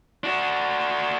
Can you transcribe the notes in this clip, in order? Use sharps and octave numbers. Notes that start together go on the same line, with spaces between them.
D4 F#4